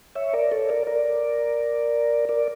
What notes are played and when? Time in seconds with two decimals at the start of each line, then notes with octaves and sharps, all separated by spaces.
0.15 C#5 E5
0.33 A#4 D5
0.51 A4 C#5
0.69 A#4 D5
0.87 A#4 D5
2.29 A#4 D5